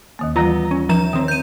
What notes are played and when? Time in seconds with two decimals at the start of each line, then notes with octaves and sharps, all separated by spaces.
0.19 D#2 D#3 A#3
0.36 E3 G3 B3 F4 A#5
0.71 C#4
0.89 F3 A#5 E7
1.13 D#3 C4 C#5 D#6
1.28 G6 D#7